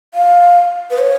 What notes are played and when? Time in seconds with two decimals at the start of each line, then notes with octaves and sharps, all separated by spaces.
0.14 F5
0.91 B4
0.99 C#5